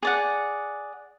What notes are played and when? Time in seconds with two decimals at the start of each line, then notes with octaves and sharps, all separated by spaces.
0.03 G#4 D5 F#5